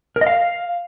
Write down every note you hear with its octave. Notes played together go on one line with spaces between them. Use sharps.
A#4
D#5
F5